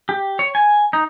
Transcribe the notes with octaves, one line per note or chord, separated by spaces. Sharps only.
G4
C#5
G#5
D#4